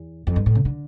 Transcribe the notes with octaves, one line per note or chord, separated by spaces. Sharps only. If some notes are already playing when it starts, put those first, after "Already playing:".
Already playing: E2
F2
G2
A2
C#3
D3